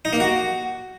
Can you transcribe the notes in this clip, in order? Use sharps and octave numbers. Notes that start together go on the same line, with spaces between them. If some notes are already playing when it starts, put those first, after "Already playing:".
D#4
A#3
F#4